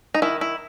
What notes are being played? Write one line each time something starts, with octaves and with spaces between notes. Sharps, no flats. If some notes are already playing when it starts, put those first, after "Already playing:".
D#4
D#3 E4
E4